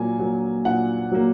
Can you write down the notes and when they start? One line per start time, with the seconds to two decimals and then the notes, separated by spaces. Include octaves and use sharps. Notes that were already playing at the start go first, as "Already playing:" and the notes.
Already playing: A#2 F#3 A#3 G#5
0.19 F#3 A#3
0.65 A#2 F#5
1.12 F#3 A#3